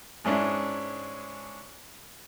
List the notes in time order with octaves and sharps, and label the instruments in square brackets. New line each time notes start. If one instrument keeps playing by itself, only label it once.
[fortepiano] G#2 G#3 C#4 D4 E4